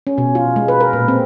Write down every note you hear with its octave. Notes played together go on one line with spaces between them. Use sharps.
C#4
B2
F4
G#3
B4
A#4
A#2
C4